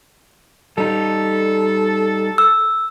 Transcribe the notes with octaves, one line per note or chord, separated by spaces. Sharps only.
G3 D#4 A4
E6